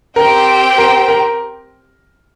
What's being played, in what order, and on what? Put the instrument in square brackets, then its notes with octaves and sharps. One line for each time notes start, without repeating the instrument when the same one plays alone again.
[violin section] C4 G4 C5 G5 [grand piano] A#4
[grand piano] A#4
A#4